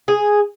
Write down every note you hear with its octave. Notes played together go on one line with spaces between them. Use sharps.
G#4